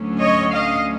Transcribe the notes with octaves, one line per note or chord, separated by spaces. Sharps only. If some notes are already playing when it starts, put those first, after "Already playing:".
Already playing: D2 D3 F#3 A3 C#4
C#5 D#5
D#5 F5